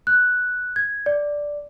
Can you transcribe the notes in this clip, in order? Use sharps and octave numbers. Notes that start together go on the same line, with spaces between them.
F#6
G#6
D5